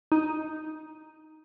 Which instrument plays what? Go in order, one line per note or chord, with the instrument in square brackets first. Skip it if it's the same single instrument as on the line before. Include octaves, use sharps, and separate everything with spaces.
[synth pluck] D#4